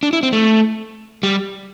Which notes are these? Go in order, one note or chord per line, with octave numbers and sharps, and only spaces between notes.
D4
E4
C4
A3
G3